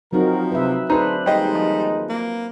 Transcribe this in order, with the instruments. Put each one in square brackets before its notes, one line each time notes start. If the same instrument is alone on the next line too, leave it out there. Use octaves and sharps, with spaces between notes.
[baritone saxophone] F3 [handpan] F#3 C4 D#4 [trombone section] F#4 A#4
[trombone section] C3 [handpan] B4 E5
[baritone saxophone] D2 [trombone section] D4 [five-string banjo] D#4 G#4 [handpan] B4 C5
[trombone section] D#2 G#3 D#4 [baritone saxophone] G3 [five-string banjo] G4 D#5 F5
[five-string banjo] F3
[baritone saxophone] A#3